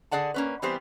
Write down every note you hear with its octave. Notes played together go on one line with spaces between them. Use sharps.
D3 G#4 D5 F#5 A5
A#3 C#4 B4
E3 G3 B3 C4 G4 C5